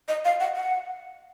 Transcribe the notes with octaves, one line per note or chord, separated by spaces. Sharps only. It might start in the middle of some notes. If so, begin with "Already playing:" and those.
D#5
F5
F#5
F#5